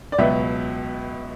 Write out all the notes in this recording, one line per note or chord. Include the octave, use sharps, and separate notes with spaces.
D5
C#2 B2 F#3 B3 E5